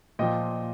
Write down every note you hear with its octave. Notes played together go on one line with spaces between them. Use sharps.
A#2 F3 D#5 G5